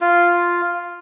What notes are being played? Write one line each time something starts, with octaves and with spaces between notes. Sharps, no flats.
F4